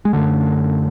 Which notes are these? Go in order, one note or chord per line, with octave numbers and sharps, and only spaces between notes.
G#3
F#2 D3 A3